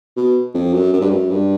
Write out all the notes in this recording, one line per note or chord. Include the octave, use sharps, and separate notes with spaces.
B2
F2
F#2
F#2
G2
F#2
G2